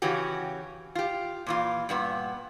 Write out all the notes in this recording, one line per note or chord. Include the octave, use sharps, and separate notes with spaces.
C#3 E3 C#4 F#4 G4
F4 G4
A#2 E3 F4
G2 A#2 B3